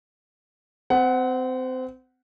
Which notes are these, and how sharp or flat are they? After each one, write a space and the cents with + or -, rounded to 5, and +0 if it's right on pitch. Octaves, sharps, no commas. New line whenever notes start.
C4 -25 F#5 +10